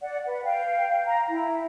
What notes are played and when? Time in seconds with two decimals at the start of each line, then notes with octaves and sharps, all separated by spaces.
0.01 D5 F#5
0.25 B4
0.44 F5 G5
1.06 A#5
1.27 E4